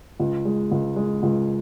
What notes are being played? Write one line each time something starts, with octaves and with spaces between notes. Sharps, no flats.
C#2
G#3
C#2
G#3
C#2